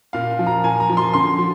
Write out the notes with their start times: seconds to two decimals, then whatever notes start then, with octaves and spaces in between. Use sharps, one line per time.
0.13 A#2 F5
0.39 F3
0.47 A#5
0.64 A#2 G#5
0.80 A#5
0.89 F3
0.97 C6
1.14 D3 C6
1.39 F3